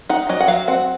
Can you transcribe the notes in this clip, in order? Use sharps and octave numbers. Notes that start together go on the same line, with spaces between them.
D#4 F#5
F#3 D#5
F#5
F#3 F5
C4 F#5